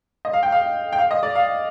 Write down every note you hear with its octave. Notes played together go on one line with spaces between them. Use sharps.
D#5
F5
G5
F5
G5
F5
D#5
D5
F5